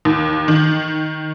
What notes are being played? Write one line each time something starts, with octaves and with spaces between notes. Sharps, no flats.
D#2
D#3